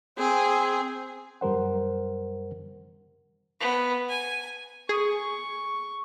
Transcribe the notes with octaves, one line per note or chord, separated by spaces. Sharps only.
C4 G#4
F#2 G3 A#4 C5 F#5
B3
G#5
G#4 C#6